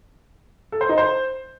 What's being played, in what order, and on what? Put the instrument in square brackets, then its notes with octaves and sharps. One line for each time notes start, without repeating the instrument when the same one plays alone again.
[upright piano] A4
C5
D#4
C5